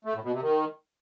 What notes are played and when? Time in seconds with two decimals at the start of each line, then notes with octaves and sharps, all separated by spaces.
0.05 A3
0.14 A2
0.23 B2
0.33 C3
0.42 D#3